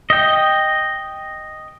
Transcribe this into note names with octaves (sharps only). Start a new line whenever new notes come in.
D#5 G5